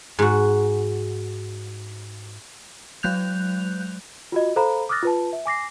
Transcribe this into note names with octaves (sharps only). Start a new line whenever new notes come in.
G#2 F#4
F#3 G#3 F#6 G6 F7
F4 F#4 D#5
A4 C5 F5 A#5 B5
D6 D#6 F6 F#6 A6 A#6
F4 B4 A5
E5
G#5 D6 A#6 C7